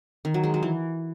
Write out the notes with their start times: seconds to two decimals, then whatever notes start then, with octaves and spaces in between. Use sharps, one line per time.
0.25 D#3
0.34 F#3
0.44 G#3
0.54 F#3
0.63 E3